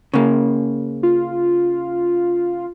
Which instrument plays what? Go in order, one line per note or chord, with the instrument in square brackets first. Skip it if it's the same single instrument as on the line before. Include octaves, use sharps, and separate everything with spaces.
[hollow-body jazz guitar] C#3 A#3
[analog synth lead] F4